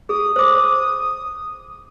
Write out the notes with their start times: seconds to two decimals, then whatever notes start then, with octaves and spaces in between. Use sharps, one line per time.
0.09 G#4 D#6
0.36 C5 D6